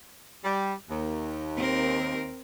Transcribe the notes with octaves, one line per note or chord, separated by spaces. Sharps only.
G3
D#2
C4 A#4